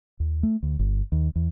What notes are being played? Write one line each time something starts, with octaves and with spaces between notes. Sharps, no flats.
D#2
A3
D2
G1
D#2
E2